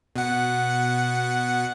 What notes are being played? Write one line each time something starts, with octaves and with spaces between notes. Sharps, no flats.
B2 F#5